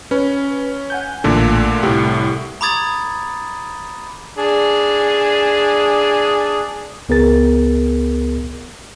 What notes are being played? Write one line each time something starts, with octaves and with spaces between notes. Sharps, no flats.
C#4 B4
F#5 G#5 G6
A1 A#2 D3 A3 A4
C2 A2 G4
A#5 B5 D6 D#6 G#6 A6
D4 G#4
C#2 B3 G#4 A#4 A6